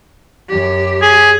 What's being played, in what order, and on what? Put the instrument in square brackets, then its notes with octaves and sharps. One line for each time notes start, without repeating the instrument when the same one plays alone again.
[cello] F#2 G4
[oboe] G#4